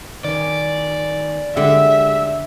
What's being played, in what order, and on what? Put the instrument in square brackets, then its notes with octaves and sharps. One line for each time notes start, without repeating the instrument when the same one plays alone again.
[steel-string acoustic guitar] D#3 C#4 [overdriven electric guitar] D5
[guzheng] D3 [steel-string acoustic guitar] G#3 G4 [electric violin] E5